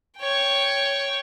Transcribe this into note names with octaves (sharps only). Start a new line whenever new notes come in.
C#5 G5